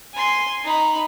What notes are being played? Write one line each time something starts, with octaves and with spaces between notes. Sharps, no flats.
G#5 C6
D#4 B5